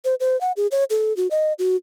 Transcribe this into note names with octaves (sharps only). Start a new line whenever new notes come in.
C5
C5
F#5
G#4
C#5
A4
F#4
D#5
F#4